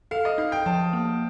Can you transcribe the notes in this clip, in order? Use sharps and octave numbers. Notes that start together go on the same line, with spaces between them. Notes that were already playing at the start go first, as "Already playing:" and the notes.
A4 F5
D#5
D#4 F5
G5
F3 A5
A#3